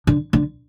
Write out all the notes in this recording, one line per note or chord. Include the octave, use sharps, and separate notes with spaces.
D3
D3